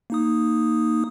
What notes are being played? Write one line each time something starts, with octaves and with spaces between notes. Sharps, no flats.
A#3 D#4 D#6